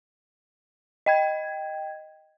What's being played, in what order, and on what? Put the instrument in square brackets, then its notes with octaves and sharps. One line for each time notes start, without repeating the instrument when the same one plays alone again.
[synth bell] D#5 G5 G#6